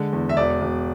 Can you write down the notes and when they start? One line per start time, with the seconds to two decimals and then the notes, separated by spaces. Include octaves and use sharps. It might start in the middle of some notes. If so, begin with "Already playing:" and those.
Already playing: D3 G#3
0.13 E2
0.29 E5
0.37 E1 D5
0.61 E1